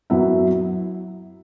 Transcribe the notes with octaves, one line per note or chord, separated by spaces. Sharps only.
F#2 F#3 B3 E4